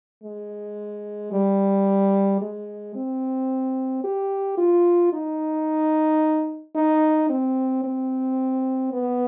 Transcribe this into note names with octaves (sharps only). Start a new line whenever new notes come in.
G#3
G3
G#3
C4
G4
F4
D#4
D#4
C4
C4
B3